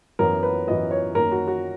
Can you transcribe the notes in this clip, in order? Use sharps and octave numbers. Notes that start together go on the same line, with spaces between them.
F#2 E3 B3 A#4
B4
F#2 E3 B3 D#5
C#5
F#2 D#3 A#3 A#4
F#4
F#4